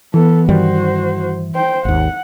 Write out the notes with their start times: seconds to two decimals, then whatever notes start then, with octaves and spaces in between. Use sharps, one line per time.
0.14 E3 B3 A4
0.49 G2 D#3 G3 F#4 C5
1.55 C5 G5
1.85 G#1 D#2 F#5